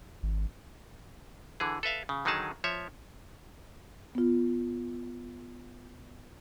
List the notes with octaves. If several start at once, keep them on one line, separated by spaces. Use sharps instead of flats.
G#1
D3 E3 G#4
A4 B4 E5 F5
C#3
D3 D#3 F#3 D#4 G#4 A5
F3 C#5 E5
B3 F4